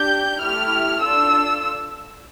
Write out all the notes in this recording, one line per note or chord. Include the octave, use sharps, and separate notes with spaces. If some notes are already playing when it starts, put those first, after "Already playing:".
Already playing: D4 G4 G6
A3 E4 G4 F6
D4 F4 A4 E6